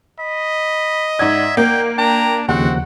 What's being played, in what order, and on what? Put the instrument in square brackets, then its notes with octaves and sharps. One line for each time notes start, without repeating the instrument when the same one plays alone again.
[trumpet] D#5 [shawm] B5
[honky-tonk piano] G#2 G#6 [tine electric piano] D5 F#5 [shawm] E5
[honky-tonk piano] A#3 [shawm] G5
[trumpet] D4 [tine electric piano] G5 [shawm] A#5
[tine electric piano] D#2 C#3 F3 [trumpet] C4 [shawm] F#4 [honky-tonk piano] F#5